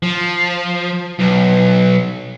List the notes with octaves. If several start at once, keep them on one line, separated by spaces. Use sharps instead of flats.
F3
B1